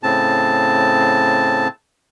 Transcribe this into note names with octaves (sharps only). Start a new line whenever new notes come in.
A2 C#3 C4 A5